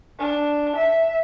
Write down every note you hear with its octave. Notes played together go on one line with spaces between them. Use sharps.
D4
E5